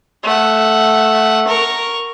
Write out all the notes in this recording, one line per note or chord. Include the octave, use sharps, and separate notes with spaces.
A3 F#5
A#4 C#6